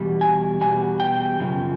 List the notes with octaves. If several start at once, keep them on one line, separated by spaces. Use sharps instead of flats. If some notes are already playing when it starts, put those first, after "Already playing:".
Already playing: E2 B2 G3
G#5
E2 B2 G3 G#5
G5
F#2 C#3 F3